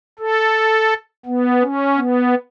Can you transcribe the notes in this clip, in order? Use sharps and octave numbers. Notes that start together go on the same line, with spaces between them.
A4
B3
C#4
B3